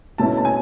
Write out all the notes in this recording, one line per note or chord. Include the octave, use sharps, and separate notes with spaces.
B2 A3 C#4 E4 A5
A5
G#5